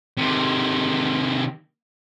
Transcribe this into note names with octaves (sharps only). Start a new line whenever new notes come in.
C3 D#3